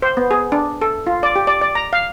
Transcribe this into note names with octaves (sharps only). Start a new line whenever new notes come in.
C5
B3
G#4
D4
A4
F4
D5
G4
D5
D5
A#5
F5